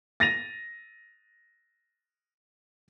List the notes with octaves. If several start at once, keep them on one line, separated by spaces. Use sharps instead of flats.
A6 A#6 D#7 F7